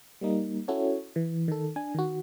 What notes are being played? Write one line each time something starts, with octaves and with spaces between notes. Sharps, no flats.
G3 A#3 D#4
C#4 E4 F#4 A4 C#5
E3
D#3 A4
D4 G#5
D#3 F#4